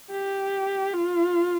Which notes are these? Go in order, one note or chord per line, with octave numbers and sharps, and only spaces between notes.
G4
F4